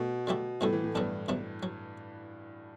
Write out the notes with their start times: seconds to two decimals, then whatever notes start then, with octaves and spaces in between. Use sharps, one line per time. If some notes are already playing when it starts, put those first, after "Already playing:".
Already playing: B2 A3 A4
0.27 D3 F#3 A3 E4 G4
0.61 A2 C3 G3 B3 F#4 A4
0.73 E3
0.84 A2
0.94 G2 F#3 B3 D4 A4
1.28 C3 F#3 B3 D4
1.63 F#3